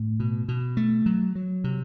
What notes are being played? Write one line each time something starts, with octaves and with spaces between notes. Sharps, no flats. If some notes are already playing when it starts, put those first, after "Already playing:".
Already playing: A2
B2
B2
A3
F#3
F#3
C3